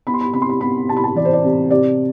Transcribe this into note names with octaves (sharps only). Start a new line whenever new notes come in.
B3 B5
C6
B5
C3 B5
C6
B5
B3 B5
C3 A5
B5
A5
E3 D5
C5
D5
C3
C3 D5